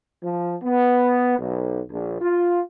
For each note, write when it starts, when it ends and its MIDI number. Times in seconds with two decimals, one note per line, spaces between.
0.23 0.55 53
0.62 1.35 59
1.39 1.81 35
1.90 2.17 34
2.20 2.59 65